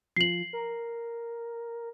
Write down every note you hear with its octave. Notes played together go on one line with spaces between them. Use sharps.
F3 C7 F#7
A#4